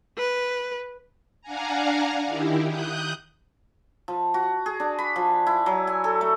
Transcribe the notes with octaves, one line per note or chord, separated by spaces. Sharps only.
B4
D4 F5 F#5 G#5 A#5
D#3 E4 G4
D#6 F#6 G6
F3
F#4
G#4
D4
B5
F3
E4
F#3
G#5
A4
A3